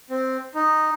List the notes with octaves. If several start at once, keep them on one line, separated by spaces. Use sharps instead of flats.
C4
D#4